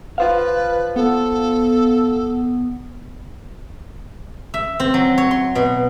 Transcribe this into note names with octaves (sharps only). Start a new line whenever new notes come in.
F4 B4 C5 F5
B3 A4
E5
C4
F#3
C#5
C6
B2